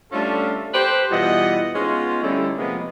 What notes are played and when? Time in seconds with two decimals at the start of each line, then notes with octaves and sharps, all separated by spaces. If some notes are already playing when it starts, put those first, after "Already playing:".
0.12 G3 A3 C#4 D4 F4 A4
0.74 G4 A4 B4 C5
1.11 B2 E3 G3 F4 D#5 F#5
1.75 G#3 B3 C#4 D#4 F4
2.23 D3 G3 A3 C#4 D#4 E4
2.58 C3 F3 G#3 A#3 B3